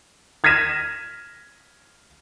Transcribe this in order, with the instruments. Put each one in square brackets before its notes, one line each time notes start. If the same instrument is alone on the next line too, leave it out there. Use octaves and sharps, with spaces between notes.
[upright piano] F6 G#6 A#6 B6 D#7 E7